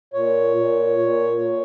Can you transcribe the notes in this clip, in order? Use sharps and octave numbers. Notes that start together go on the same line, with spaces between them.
A#2 C#5
A#2
A#2
A#2